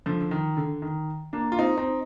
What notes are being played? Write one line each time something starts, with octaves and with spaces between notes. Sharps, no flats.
D3 F3
D3
D#3
D3
D#3
A#3 D4
F4
C4 D#4
C4 D#4